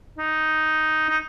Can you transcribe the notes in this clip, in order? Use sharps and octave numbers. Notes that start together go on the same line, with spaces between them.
D#4
D#4